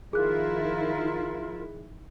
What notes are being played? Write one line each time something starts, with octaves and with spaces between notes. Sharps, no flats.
D#3 F3 E4 F4 G#4 A#4 F#6